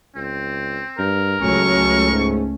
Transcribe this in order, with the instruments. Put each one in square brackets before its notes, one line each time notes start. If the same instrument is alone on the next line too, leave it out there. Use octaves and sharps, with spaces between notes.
[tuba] C#2 [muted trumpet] C4
[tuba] G2 [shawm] A#4
[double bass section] C#2 A3 C#4 [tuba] F#3 [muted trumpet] C#6
[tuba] G#2